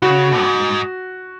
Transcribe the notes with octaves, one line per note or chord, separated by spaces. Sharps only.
C#3 F#4
F#2
G#2